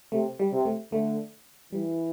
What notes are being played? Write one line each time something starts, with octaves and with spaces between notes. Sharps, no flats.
C3 A3
G3
C3
A3
D3 A3
E3 G3